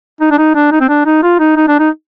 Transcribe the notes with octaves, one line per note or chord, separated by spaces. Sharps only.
D#4
D4
D#4
D4
D#4
C4
D4
D#4
F4
D#4
D#4
D4
D#4